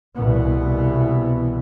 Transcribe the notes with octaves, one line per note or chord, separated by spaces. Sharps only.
C2 B2 E3 B3